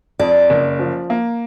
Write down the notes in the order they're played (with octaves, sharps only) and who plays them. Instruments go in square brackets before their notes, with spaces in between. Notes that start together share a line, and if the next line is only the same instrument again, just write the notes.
[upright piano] F2 [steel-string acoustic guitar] D5
[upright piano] F#1
F3
A#3